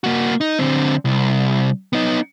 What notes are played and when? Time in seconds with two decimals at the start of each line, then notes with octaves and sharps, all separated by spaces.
0.04 A#3 F#4
0.41 D#4
0.59 D3 C4
1.05 C2
1.93 B3 D#4